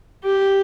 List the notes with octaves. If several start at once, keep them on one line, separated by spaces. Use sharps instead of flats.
G4